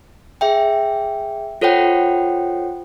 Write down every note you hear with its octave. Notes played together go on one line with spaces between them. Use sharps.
G#4 E5 G5
F4 A4 C5 C#5 F#5 G5